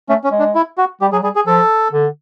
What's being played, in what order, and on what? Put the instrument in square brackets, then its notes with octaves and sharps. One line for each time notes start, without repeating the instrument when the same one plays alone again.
[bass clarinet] A3 [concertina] C#4
[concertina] C#4
[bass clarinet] G#3
[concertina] D4
E4
F#4
[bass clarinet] G3 [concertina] G4
[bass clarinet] F#3 [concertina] G#4
[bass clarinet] G3 [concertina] G#4
[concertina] G#4
[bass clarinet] F3 [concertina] A4
[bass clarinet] D3